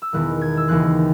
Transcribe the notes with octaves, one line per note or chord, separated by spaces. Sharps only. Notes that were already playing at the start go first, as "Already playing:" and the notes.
E6
E1 E2 D#3 F#6
G#6
E6
D#2 C#3 E3 C4 F#6